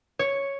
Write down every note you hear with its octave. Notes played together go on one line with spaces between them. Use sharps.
C#5